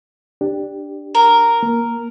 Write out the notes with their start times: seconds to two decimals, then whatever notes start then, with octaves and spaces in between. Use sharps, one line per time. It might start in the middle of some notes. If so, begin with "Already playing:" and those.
0.41 D4 G4
1.15 A#4
1.63 A#3